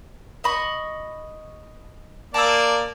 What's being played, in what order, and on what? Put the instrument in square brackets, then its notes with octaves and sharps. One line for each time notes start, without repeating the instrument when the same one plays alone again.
[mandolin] D#5 B5 C#6
[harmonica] A#3 D5 [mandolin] A5 E6